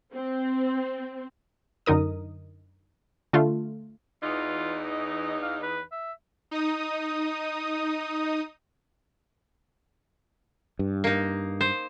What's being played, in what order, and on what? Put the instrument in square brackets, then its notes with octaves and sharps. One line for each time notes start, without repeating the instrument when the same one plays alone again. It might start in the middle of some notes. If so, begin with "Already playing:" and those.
[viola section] C4
[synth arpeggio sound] F#2 D3 D#4 A#4 D#6
D3 A3 F4
[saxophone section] E2 E3 D#4 [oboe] F4
[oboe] D#5
F5
B4
E5
[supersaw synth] D#4 D#6
[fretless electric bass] G2
[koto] A#3 D#4
C5